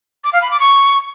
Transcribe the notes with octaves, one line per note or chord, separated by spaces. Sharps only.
D6
F5
B5
D6
C#6